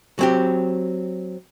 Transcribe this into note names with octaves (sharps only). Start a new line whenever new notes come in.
F#3 C4 G4